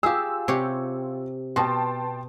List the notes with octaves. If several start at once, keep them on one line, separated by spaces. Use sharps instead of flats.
F4 G4 G#4 E6
C3 G4 C#5
B2 G5 A5 C6